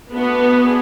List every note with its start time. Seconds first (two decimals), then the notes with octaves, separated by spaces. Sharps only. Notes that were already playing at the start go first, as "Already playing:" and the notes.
0.12 A3 B3 D4 F#4
0.65 A3 D4 G#4 B4